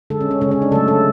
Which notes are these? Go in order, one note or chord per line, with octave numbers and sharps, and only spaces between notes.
D3 G#3 A4
C#4
C#4
C#3 G#3 C#4
C#4
D4
C#3 F#3 A3 A4
A4